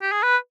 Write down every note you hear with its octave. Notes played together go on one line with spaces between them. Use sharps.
G4
G#4
B4